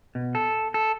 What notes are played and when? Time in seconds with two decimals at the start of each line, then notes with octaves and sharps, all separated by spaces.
0.15 B2
0.35 A4
0.74 A4